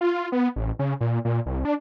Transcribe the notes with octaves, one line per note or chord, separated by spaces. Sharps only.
F4
B3
A1
C#3
A#2
A#2
C2
D4